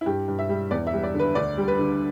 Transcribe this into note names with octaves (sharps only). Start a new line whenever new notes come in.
E4
G2 G4
G2
E5
G3
E2 D5
E5
G3
D5
D3
B4
D2 D5
G3
B4
D3